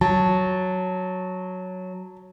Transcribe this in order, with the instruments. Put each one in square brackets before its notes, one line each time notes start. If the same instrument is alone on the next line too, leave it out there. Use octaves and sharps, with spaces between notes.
[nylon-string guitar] F#3 [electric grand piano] A5